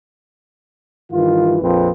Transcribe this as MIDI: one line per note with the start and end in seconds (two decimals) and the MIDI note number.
1.12 1.56 43
1.12 1.56 51
1.12 1.56 52
1.12 1.56 65
1.61 1.89 34
1.61 1.89 41
1.61 1.89 53
1.61 1.89 60
1.61 1.89 71